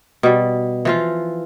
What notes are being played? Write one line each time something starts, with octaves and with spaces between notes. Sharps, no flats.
B2 G3
E3 F3 F4